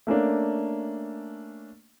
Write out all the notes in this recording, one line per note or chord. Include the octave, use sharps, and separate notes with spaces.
A3 A#3 C#4 D4